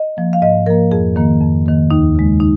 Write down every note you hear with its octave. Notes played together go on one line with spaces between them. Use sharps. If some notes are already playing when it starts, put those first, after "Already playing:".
Already playing: D#5
F3 A#3
F5
G#2 D#5
F3 A#3 A#4
F2 G#4
D#3 A#3
F2
D#3 A#3
D#2 D#4
C#3 G#3
D#4